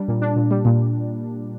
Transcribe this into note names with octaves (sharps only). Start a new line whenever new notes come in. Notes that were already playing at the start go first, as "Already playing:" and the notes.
Already playing: G3 D4
A#2
D4
A#2
G3
A#2